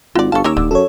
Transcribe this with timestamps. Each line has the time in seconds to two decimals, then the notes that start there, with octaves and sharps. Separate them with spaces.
0.15 G#1 F4 F#4 D5
0.32 G1 A4 F5 A5 C#6
0.44 D#2 C#4 A#4 C#5 D6 E6
0.57 D#1 D3
0.71 F#2 A4 C#5